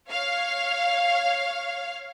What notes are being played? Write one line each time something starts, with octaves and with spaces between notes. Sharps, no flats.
C#5 F5